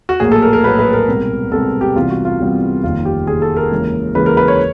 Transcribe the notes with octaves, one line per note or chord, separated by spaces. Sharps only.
F#4
A#1 A2 F#3 A#3 G#4
A4
A#4
A#4
A#1 A2 F#3 A#3 B4
B4
A#4
C2 B2 G#3 C4
C2 B2 G#3 C4 A4
G4
C2 C3 E3 G3 B3 F4
F#4
F4
C2 C3 E3 G3 B3
F1 D#2 D#3 F4
G4
F1 D#2 D#3 G#4
A4
A#4
D#2 C#3 E3 G#3
D#2 C#3 E3 G#3 B4
A#4
B4
C#5